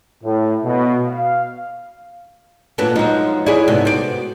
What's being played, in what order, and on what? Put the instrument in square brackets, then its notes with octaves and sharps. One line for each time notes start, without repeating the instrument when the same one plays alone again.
[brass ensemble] A2
B2
F5
[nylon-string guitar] A#2 A4 [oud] F#3 B3 D4
[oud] F3 F#3 [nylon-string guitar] G#3 D#4
[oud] E4 G#4 [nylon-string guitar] F#4 C#5 D5
[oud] G#2 C3 [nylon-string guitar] B3 F#4 A4
[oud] C5 D5